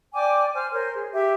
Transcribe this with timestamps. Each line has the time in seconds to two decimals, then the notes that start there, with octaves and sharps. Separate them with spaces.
0.13 D5 G5 G#5 D6
0.54 C5 G#5 F6
0.72 A#4 C5 C#5
0.95 G#4
1.12 G4 E5